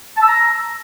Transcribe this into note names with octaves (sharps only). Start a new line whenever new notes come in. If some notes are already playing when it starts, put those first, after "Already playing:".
A5
E6
A#5